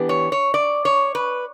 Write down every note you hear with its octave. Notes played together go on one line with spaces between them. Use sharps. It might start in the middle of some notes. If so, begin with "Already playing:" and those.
Already playing: E3 B3 D4 G4
C#5
C#5
D5
C#5
B4